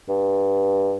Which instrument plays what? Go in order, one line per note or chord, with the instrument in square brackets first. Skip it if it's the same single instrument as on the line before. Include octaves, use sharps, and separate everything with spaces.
[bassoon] G2